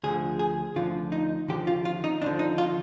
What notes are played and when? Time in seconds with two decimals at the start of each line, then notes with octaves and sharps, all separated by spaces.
0.03 D2 D3 F3 G#4
0.39 G#4
0.76 D2 D3 F3 F4
1.12 D#4
1.48 D#2 D3 F3 G4
1.67 F4
1.85 F4
2.04 D#4
2.22 D#2 D3 F3 D4
2.39 D#4
2.58 F4